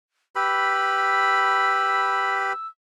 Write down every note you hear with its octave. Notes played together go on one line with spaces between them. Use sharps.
G4 B4 B5 E6